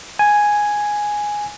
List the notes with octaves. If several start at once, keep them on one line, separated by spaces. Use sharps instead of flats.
G#5